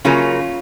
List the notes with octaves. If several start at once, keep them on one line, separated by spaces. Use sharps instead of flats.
C#3 F#3 A#3 C#4 F4